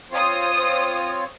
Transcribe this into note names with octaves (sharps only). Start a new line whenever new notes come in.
C4 F4 C5 C#5 D#6